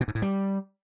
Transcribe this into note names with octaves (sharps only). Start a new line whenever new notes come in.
B2
G#2
A2
G3